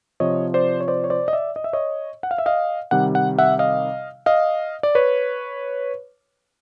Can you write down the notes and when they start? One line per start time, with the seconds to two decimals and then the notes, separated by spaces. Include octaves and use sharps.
0.20 C3 F3 C#5 D#5
0.54 C5 D5
0.81 C#5
0.88 C5 D5
1.04 C#5
1.10 C5 D5
1.28 D#5
1.33 D5 E5
1.56 D#5
1.64 E5
1.73 C#5 D#5
2.23 F#5
2.31 F5
2.38 E5
2.46 D#5 F5
2.91 C3 D#3 G3 F#5
3.15 F#5
3.38 E5 F#5
3.59 D#5 F5
4.26 D#5 F5
4.83 D5
4.95 B4 C#5